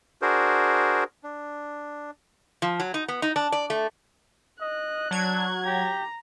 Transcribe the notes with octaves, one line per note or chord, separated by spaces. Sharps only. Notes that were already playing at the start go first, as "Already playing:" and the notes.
D4 F#4 G#4 A#4 C5
D4
F3
F#3
D#4
B3
D#4
D4
D5
A3
D#5 F#6
F#3 D4 G#6
G4 A#5